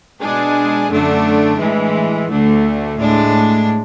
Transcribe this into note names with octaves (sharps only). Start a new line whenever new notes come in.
B2 G#3 D4 G#4
F#2 D3 A3 D4
A2 E3 G#3
D2 D3 A3
A2 G#3 D4